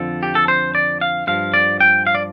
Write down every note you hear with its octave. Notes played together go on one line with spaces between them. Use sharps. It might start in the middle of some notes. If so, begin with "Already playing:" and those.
Already playing: F2 D3 F3 A4
G4
A4
C5
D5
F5
G2 F3 F5
D5
G5
F5
D5